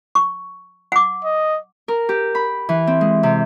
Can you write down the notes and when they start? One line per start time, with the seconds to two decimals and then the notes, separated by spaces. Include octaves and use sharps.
0.15 C#6
0.92 F#5 D6
1.25 D#5
1.88 A#4
2.09 G4
2.35 B5
2.69 E3
2.87 C4
3.01 G#3
3.23 C3